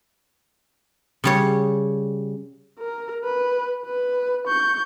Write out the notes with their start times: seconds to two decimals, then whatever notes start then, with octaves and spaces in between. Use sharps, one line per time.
1.24 C#3 G3 C#5
2.79 A#4
3.24 B4
3.85 B4
4.47 C#6 G6